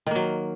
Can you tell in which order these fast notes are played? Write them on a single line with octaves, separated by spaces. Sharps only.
D#3 A#3 F#3